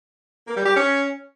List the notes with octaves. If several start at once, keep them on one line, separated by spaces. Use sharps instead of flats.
A#3
G3
G4
C#4